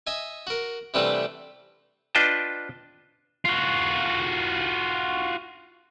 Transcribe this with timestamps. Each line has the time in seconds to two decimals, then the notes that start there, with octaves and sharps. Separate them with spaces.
0.07 D#5 E5 G#5
0.47 F#4 A#4
0.94 C3 E3 G3 A3 D4 F#4
2.15 D4 F4 B4 D#5 G5 A5
3.45 F4 F#4